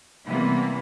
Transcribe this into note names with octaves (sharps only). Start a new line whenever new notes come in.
C3 E3 G3 A#3 B3